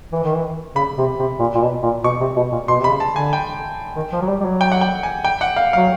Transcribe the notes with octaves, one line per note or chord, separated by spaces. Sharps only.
E3
D#3
E3
C#3 B5
C3
C3
A#2
A#2
B2
A#2
B2 C#6
C3
B2
A#2
B2 C6
C3 B5
C#3
A5
D3 G#5
G5
D#3
F3
F#3
G3
G3
F#3
G5
F#5
G5
G#5
G5
F#5
F5
F#3 F5